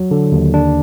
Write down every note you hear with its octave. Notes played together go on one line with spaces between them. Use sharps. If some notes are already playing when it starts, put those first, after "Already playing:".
Already playing: F#3
D3
D#2
D4